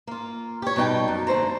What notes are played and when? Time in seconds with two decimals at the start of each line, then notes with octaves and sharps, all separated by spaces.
0.07 A#3 F4
0.62 G4 C#5
0.76 B2 G3 D#4 G5 A5
1.08 F#2
1.27 D#2 D3 A3 C5 A#5